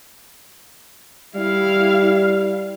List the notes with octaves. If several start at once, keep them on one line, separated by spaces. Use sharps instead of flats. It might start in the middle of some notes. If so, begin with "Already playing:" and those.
G3 E4 F5